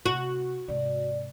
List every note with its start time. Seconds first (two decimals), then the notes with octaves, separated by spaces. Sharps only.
0.06 C3 F#4
0.68 G#2 C3 D5